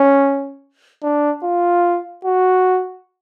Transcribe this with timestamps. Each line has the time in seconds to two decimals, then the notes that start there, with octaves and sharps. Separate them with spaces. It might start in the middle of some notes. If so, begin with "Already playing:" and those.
Already playing: C#4
1.03 D4
1.43 F4
2.25 F#4